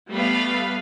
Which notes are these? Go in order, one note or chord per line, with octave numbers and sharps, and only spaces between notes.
G3 A3 B3 B4 F5 B5